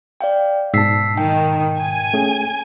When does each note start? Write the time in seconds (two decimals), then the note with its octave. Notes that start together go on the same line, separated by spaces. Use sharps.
0.21 D5 F5 G5
0.74 G#2 B2 A5 E6 B6 C7
1.17 D#3 G5
1.80 G#5
2.14 A3 C#4 G#4